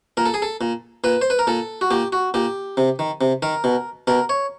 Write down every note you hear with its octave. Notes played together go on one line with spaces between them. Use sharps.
A#2 A#4
A4
G#4
A4
A#2
A#2 B4
C5
B4
A#4
A#2 A4
F#4
A#2 G4
F#4
A#2 G4
C3
D#3
C3
D#3 A#4
B2
B2 A#4
C#5